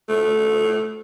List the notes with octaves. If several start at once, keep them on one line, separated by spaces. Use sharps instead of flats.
A3